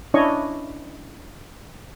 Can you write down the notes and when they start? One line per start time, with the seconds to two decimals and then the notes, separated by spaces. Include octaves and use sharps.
0.14 C#4 D4 E4 C#5 D#5 C#6